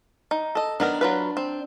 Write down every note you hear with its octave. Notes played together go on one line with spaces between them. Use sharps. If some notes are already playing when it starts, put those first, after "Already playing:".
D#4
A4 D#5
D#3 B3 D4 A#4
F#3 F4 B4
C4